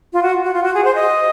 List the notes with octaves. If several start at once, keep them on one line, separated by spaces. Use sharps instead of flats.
F4
F#4
F#4
F4
F#4
G#4
C5
D#5